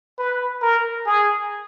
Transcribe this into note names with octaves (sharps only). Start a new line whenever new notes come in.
B4
A#4
G#4